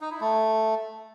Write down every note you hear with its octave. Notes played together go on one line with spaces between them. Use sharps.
D#4
E4
A3